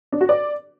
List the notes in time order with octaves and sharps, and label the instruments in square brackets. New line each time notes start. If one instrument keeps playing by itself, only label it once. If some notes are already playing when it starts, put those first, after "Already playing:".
[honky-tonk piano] D4
F#4
D5